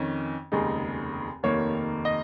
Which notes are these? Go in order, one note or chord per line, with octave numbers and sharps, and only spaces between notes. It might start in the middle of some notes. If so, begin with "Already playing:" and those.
Already playing: F2 D#3 C#4
F1 D#2 C#3 G#3 D#4
F1 D#2 D#3 A#3 C#5
D#5